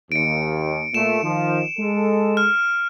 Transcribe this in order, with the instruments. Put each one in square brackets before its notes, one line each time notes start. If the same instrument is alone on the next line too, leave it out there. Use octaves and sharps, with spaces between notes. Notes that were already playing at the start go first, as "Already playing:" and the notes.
[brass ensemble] D#2 [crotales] C#7 D7
[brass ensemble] A#2 A3 [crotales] E7
[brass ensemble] D#3 F3
G#3 A4
[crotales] F6